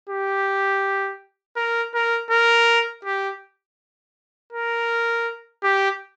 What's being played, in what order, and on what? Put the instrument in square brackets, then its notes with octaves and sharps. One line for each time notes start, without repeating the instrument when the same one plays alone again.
[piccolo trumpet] G4
A#4
A#4
A#4
G4
A#4
G4